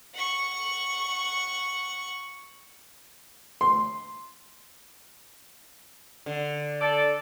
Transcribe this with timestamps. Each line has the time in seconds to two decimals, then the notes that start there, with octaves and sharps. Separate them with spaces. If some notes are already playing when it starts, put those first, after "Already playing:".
0.14 F#5 C#6
3.61 C6
6.26 D3
6.81 A4 D5